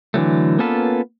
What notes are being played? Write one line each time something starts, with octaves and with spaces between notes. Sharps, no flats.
D3 E3 F#3 A3
A#3 B3 C#4 F4 A4 B4